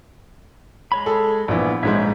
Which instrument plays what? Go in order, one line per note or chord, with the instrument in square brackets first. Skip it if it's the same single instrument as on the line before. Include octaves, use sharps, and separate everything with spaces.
[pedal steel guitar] G#3 C#5 B5
[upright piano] G#4 A4
[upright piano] A#1 E3 [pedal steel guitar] B3
[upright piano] A#1 G#2 G#3 [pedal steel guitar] C#5 E5